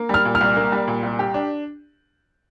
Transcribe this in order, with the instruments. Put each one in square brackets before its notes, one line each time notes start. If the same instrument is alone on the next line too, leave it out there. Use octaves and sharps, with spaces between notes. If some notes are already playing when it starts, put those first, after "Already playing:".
Already playing: [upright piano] A#3
[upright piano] G3 [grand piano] F6
[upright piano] A#2
[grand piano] F6
[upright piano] C2
A#3
G3
A#2
C2
G4
D4